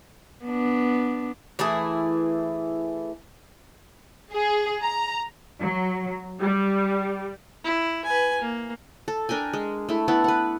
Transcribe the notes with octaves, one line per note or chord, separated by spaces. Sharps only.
B3 D4
E3 A3 E4 G#4
G#4
A#5
F#3
G3
E4
B4 G#5
A#3
A4
D4 A#4 G5 G#5
G#3
A3 E4
B3 E4 A4 F#5
B4 F#5